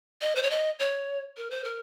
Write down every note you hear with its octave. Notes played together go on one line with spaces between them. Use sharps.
D#5
C5
C#5
D#5
C#5
A#4
C5
A#4